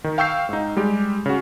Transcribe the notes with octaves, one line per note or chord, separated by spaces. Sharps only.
D#3
F5 G5 C#6 E6 G6 C7
G#2 D#4
G3 G#3 G4
C#3 F#4